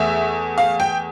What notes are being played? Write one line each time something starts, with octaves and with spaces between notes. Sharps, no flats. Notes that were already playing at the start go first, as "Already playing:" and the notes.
Already playing: E2 A3 E5
F5
G5